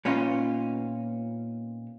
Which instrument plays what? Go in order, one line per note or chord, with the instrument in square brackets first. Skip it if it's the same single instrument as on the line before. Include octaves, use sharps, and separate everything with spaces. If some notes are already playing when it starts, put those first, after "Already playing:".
[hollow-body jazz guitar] A#2 B3 C#4 D#4 F4